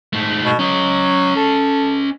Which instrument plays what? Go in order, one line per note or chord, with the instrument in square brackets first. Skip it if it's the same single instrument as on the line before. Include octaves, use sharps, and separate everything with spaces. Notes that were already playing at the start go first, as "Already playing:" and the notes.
[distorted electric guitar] G#2 A3
[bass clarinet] B2
[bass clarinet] F#3 [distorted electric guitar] C#4 D#5
[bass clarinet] A4